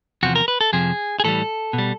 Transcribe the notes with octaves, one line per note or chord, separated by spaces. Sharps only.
E2 C3 F3 F#4
A#4
B4
A4
F2 C3 F3 G#4
G#4
A2 E3 G3 A4
B2
G3